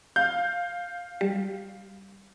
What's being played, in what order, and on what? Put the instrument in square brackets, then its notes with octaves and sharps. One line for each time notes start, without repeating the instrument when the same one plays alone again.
[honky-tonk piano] F5 [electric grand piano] G6
[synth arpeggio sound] G3